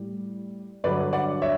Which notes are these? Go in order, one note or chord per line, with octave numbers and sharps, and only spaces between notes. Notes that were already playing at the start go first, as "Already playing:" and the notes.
Already playing: A2 G3
G2 D3 F#3 B4 D5
D5 F#5
C#5 E5